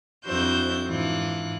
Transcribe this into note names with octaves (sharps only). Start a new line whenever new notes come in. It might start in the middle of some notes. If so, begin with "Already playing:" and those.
F2 D4 E4 F#4 C5 G6
G#2 E3 D4 F4 F#6